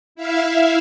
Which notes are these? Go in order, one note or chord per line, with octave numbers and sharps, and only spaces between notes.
E4 E5 F5